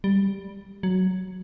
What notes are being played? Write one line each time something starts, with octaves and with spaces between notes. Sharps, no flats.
G3
F#3